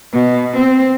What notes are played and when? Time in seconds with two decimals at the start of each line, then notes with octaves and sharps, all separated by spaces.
0.13 B2
0.57 C4